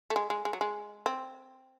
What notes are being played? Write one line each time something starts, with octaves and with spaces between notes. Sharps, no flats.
A3
G#3
G#3
G#3
F#3
G#3
C4